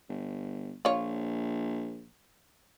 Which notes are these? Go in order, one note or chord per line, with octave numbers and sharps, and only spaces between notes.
G1
A#1 F4 C#5